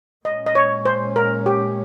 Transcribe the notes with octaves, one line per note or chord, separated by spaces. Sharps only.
A#2 G#3 C#4 D#5
D#5
C#5
C5
A#4
G4